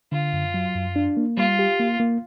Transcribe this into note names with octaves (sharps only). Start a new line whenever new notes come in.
D3 F4
F#2
F#3
F#2
D4
A#3
G3 F4
G4
A#3
A#3